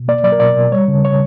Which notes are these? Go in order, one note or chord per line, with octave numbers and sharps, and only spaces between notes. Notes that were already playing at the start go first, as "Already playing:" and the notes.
Already playing: B2
A#3 D5
F#3 D5
A#4
B2 D5
B2
G3 C#5
C#3
C#5